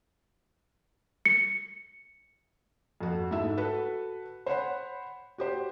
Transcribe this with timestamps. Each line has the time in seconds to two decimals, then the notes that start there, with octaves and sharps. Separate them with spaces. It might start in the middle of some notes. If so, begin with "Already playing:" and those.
1.25 C#7
3.01 F2 F#4
3.31 G#2 A3 E4 E5 E6
3.57 F#4 A4 B4
4.46 C5 C#5 F#5 B5
5.38 F#4 G4 C5